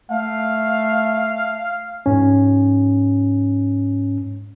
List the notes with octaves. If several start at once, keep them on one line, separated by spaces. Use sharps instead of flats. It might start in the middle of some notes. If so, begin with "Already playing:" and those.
A3 F5
G#2 C#4